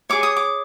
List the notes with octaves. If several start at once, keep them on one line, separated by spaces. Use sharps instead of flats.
G#4 C#5 D6
D#6
D6